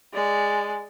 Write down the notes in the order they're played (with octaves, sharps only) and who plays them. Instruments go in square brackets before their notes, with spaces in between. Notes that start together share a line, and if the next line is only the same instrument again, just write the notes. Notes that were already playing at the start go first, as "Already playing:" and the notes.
[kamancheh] G#3 D5